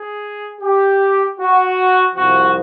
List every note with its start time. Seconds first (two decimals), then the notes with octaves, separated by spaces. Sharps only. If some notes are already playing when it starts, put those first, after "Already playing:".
Already playing: G#4
0.61 G4
1.39 F#4
2.16 C2 C3 F3 F#4